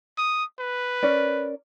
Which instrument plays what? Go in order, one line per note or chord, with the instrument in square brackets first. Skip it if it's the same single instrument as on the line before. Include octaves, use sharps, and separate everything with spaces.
[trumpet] D#6
B4
[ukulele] C#4 A#4 D5